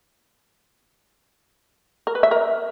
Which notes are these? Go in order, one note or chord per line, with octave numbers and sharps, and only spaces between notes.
A#4
B4
E5
A#4